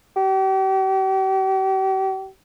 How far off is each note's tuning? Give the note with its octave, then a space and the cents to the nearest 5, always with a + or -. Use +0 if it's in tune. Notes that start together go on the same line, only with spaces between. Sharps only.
G4 -40